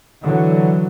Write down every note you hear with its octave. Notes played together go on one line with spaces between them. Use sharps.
D3 E3 F#3